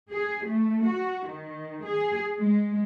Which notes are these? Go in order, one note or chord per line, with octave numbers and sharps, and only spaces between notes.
G#4
A3
F#4
D#3
G#4
G#3